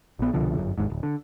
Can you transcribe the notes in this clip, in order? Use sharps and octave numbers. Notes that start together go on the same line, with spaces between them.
A#1 B3
C2 B2 D3 F3
G1 F#2
G#1 D#2 G#2
D1
D3